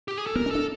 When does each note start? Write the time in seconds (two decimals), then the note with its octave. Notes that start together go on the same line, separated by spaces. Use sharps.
0.08 G4
0.18 G#4
0.27 A4
0.35 B3 A#4
0.46 C#4
0.51 D4 A4